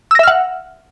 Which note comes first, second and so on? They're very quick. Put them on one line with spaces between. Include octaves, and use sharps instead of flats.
E6 A#6 E5 F6 F#5